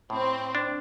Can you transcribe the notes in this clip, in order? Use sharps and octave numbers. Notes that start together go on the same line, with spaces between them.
A2 C4
D4